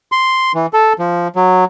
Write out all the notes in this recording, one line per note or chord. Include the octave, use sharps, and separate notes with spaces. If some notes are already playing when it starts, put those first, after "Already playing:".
C6
E3
A4
F3
F#3